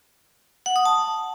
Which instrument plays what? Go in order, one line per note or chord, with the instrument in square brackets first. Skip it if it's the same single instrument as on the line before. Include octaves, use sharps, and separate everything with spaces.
[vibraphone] F#5
D#6
A5